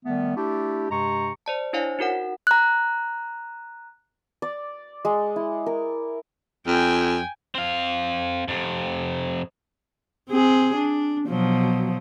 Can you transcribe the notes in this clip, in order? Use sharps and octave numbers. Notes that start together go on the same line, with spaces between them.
D#3 G3 A3 B3
A3 D4 E4 G4
G2 C3 G#3 G4 A#5 C#6
C5 D5 A5
D4 E4 C5 C#5 F5 G#5
D#4 F#4 A#4 F#5
A#5 F#6
D5
G#3
E4
A#4
F2 G5 G#5
C4 F5
F2 C3
C4 G#4
D4
B2 F3 F#3